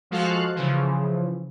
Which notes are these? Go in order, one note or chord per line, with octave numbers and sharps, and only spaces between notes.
F3 G#3 F#4 A4 F5 F#6
C#3 E3 F3